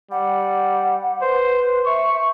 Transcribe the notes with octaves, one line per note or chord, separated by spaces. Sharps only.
G3 F#5
B4 C5
E5 C#6